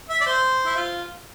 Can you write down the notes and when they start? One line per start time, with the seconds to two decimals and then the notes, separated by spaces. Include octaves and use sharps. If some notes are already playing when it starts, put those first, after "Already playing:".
0.09 E5
0.21 D5
0.26 C5
0.66 E4
0.76 F4